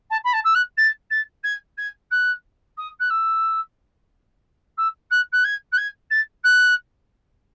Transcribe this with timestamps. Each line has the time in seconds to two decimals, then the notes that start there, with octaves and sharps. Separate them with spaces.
0.10 A5
0.24 B5
0.33 A5
0.44 E6
0.54 F#6
0.77 A6
1.10 A6
1.43 G#6
1.77 G#6
2.11 F#6
2.77 D#6
2.99 F#6
3.10 E6
4.77 E6
5.10 F#6
5.32 F#6
5.44 G#6
5.72 F#6
5.77 G#6
6.10 A6
6.44 F#6